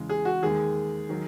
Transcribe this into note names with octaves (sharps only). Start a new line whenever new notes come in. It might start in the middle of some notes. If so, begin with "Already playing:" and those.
Already playing: E2 C#3 G#3
G#4
F#4
D#2 D#3 G#3 G#4
D#3 F#3